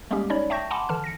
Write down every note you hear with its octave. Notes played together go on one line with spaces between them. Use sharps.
G3 G#3 A#3 B3 C#4 G4
C#4 D#4 C#5 D5 B5
E5 G5 A5 C#6 G6 A#6
F#5 G#5 A5 B5 C6 D6
D3 E3 A5 F6
A#6 C#7